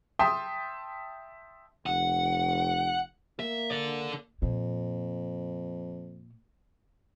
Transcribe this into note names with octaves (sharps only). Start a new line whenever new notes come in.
E5 G5 A5 C6 D#6
F1 F#5
A#3 E5
A4 D5
F2 A#2